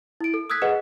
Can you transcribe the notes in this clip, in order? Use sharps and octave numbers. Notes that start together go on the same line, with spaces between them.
E4 D7
A4
D#6 E6 F#6 G#6 B6
G#4 B4 D#5 F#5